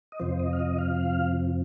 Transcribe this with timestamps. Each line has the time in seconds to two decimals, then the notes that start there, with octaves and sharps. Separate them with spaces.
0.12 D#5
0.20 F2 C3 F3 C5
0.39 D#5
0.53 F5
0.60 D#5
0.79 F5